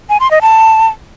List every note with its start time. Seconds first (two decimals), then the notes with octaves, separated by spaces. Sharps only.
0.09 G#5
0.20 C6
0.31 D#5
0.42 A5